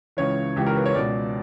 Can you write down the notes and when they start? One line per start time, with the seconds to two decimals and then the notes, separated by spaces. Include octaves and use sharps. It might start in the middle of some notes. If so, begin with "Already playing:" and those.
0.17 C#2 C#3 E3 C#5
0.56 C#2 C#3 E3 G4
0.67 A#4
0.76 B4
0.86 C#5
0.95 C#2 B2 D5